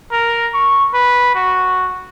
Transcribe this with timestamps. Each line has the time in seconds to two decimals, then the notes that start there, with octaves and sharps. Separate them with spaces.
0.12 A#4
0.54 C#6
0.94 B4
1.35 F#4